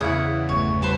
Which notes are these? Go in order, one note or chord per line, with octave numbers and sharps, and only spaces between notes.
E2 C#3 E4 C#5 F#5 D#6
G1 D3 A3 C#5
G3 A4 B4 C5